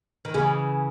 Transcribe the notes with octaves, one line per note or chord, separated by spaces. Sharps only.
D#3
C#3 E3 G#4